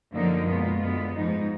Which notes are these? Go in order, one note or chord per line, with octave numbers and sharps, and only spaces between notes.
F#2 D3 F3 A#3 D#4
B2 G#3 B3 F4
F#2 D3 G#3 B3
G#2 F3 G#3 D#4